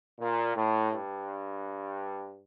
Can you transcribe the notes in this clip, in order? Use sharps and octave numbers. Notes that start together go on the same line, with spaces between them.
A#2
A2
G2